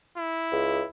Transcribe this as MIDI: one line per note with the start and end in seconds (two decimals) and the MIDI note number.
0.18 0.90 64
0.51 0.81 37